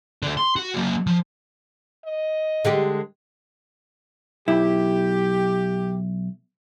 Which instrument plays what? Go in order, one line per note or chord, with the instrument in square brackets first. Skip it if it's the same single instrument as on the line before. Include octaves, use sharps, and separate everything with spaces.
[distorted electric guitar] D3 A3
C6
F#4
F#3 A#3
F3
[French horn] D#5
[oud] D3 G#3 G4
[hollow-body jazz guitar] B1 E4 [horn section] G4